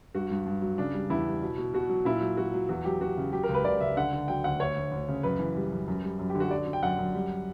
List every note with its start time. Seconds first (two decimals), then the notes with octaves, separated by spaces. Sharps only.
0.15 G2 F#4
0.31 G2
0.46 G2
0.62 F#3
0.78 C#3 D4
0.94 G3
1.10 E2 E4
1.26 G3
1.42 B2
1.58 B2
1.73 B2 F#4
1.89 F#3
2.05 A#2 E4
2.21 F#3
2.37 F#3 F#4
2.54 F#3
2.69 E2 F#4
2.85 F#3 G4
3.01 F#3 F#4
3.17 C#3
3.33 F#3 G4
3.43 A#4
3.49 C#2
3.54 B4
3.65 C#2 D5
3.81 C#2 E5
3.96 D3 F#5
4.13 D3
4.28 F#3 G5
4.44 D2 F#5
4.60 D2 C#5
4.76 D2
4.91 D2
5.08 C#3
5.23 F#2 B4
5.39 E3
5.56 G3
5.72 F#2
5.88 F#2
6.03 G3
6.19 F#2
6.30 G4
6.35 D3
6.40 F#4
6.51 F#3 D5
6.67 D3
6.73 G5
6.83 F#2 F#5
6.98 F#2
7.15 G3